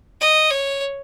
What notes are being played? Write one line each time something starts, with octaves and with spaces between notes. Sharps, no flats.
D#5
C#5